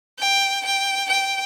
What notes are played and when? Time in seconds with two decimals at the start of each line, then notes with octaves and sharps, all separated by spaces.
0.19 G5
0.65 G5
1.09 G5